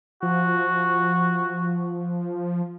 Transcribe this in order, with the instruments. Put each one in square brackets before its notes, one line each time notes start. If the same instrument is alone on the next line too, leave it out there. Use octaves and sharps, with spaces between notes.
[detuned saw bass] F3 [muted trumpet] F#4